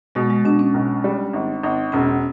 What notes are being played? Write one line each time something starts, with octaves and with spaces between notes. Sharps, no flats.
B2 G#3
G#3
B2 D4
C#4
B1
G3
G#1
G#1
E1 C#4